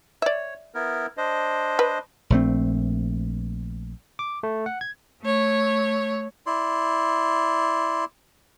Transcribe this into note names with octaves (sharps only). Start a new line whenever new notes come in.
C#5 D5 E5
B3 E4 A#4
D4 C5 D#5
B4
A#1 A3 C4
D6
A3
F#5
G#6
A3 C#5
E4 D5 C6